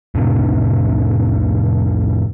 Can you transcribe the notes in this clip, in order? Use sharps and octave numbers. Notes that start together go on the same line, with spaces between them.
F2 A2 C3 D4